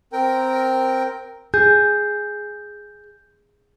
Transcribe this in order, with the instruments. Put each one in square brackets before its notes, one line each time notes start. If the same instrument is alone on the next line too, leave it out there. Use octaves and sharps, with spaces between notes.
[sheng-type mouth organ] C4 A#4 G5
[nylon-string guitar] G#4 [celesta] G6